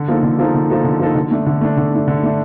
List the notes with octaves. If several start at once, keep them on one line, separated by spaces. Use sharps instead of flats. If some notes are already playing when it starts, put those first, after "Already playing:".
Already playing: D3
F3 A#3 D#4 A4
D3
F3 A#3 D#4 A4
D3
F3 A#3 D#4 A4
D3
F3 A#3 D#4 A4
D3
A3 D4
D3
A3 D4
D3
A3 D4
D3
A3 D4